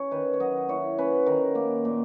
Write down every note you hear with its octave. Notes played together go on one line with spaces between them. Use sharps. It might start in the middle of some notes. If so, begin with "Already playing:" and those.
Already playing: C#4 C#5
D#3 B4
C#5
F#3 D#5
E4 C#5
C#4 B4
D#3 A#4
A#3
A#2